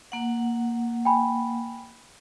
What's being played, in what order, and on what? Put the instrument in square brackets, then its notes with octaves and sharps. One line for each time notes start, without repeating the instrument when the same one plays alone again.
[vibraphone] A#3 F#5
[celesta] G5 G#5 B5